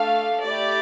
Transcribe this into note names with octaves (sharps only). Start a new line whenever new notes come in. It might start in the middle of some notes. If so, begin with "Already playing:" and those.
Already playing: A3 D4 A4 F5
A3 E4 G4 D5